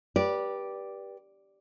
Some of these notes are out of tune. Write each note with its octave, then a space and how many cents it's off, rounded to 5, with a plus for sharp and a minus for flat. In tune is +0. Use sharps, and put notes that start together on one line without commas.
G4 +0 B4 -25 D5 +0